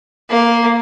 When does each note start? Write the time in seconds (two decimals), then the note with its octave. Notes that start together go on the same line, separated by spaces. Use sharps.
0.30 A#3